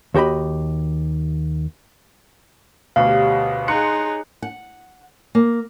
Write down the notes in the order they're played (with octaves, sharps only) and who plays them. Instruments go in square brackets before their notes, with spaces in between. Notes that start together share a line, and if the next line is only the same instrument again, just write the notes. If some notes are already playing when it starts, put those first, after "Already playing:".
[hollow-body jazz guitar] D#2 F#4 G4 D#5 B5
[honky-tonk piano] D2 B2 [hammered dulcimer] G4 C#5 [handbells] F5
[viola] D#4 G#4 [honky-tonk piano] C6 F#6 C#7
[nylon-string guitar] F#5
A#3